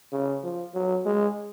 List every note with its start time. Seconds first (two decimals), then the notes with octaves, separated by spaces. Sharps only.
0.12 C#3
0.43 F3
0.75 F#3
1.06 G#3